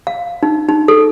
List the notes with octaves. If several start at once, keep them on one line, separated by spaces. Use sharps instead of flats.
F5
D#4
D#4
A4